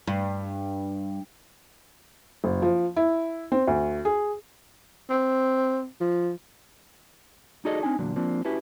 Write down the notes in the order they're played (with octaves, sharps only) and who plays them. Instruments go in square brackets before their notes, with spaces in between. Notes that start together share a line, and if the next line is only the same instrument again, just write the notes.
[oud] G2
[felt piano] F#1
F3
E4
C4
D2
G#4
[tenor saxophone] C4
F3
[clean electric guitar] D#4 F#4 G#4 A4 D5 D#5
C4 D4 D#4 G#5
E2 A#2 D3 F#3
F3 A#3 C4 D4
C#4 E4 F#4 G4 B4 A5